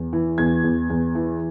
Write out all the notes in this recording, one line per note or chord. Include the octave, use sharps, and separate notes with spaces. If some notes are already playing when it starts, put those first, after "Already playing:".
Already playing: E2
E3
E2 G#6
E2
E2
E3